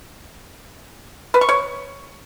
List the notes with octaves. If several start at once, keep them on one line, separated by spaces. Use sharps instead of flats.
B4
C#6
C#5